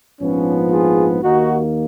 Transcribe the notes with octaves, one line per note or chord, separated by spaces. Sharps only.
A#1 G#2 F3 B3 C#4
F4 G#4
D#2 D#3 A#3 D#4 F#4